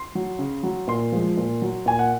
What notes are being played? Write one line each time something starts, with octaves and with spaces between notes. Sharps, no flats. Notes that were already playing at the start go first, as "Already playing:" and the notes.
Already playing: C6
F#3
C#3
F#3
A#2 C6
F3 G#3
A#2
F#3
A#2 G#5
F#5